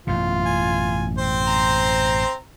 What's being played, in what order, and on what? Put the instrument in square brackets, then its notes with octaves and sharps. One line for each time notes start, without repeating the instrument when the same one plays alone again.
[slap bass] A1 F#2 B2 [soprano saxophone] F4
[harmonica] G#5
C4 C5
[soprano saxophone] A#5